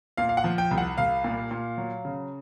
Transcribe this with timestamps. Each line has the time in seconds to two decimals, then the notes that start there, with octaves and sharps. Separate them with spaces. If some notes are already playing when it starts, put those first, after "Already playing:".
0.17 A#2 F5
0.29 F5
0.37 F#5
0.44 F3
0.58 G5
0.71 C2
0.78 F#5
0.98 C2 F5
1.24 A#2
1.51 A#2
1.78 F#3
2.05 C#3